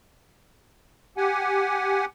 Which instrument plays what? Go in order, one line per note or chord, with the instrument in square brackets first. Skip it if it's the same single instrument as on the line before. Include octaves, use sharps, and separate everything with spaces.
[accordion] G4 F#5 G#5